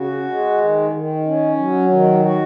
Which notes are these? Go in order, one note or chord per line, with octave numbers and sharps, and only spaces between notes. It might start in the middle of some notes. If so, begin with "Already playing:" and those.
Already playing: C#3 F#4
G#3
D#3
D#3
C#4
F#3
D#3
F#4